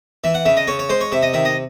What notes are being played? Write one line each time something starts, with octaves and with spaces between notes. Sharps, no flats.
E3 E5
F#5
C#3 E5
D#5
C#3 C#5
C#5
G#3 C5
C#5
C3 E5
D#5
D#3 E5
D#5